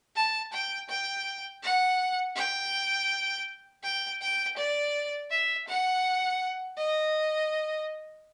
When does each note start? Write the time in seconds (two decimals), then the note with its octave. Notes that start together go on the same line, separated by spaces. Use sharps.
0.16 A5
0.53 G5
0.89 G5
1.63 F#5
2.36 G5
3.83 G5
4.21 G5
4.57 D5
5.31 E5
5.68 F#5
6.77 D#5